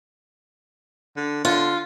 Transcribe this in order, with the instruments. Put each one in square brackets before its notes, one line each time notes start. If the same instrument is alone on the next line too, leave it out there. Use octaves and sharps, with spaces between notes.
[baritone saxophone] D3
[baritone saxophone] D3 [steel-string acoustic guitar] F4